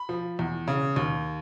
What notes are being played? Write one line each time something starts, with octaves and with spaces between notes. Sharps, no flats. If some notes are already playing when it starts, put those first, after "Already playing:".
Already playing: B5
F3
E2
C#3
D#2